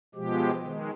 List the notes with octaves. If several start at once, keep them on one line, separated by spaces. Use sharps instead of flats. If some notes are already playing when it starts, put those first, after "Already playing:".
B2 F3 G#3 G4
D#3 G#3